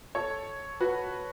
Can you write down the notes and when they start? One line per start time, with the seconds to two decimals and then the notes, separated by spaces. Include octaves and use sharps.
0.15 A4 C#5
0.80 F#4 B4